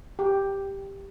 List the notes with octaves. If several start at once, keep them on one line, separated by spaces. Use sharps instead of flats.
G4